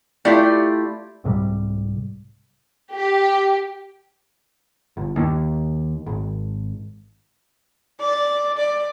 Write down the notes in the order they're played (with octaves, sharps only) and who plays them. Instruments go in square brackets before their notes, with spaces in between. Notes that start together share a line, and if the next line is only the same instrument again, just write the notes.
[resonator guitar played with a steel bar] A3 E4 F4 G4 D5
[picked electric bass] C2 G#2 C3 G3
[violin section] G4
[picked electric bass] G1
D#2
G#1
[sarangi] D5
D5